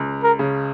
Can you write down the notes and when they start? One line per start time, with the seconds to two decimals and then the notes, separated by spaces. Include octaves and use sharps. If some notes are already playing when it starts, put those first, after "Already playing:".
Already playing: C#2
0.24 A#4
0.39 C#3